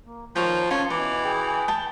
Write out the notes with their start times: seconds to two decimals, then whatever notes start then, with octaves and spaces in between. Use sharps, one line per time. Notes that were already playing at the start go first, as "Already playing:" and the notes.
0.06 A#3
0.36 D#2 F3 A#4 C#5 G5
0.70 C#4 F4 A5 C6
0.90 B2 E3 D6
1.24 G#4 G5
1.68 G5 A5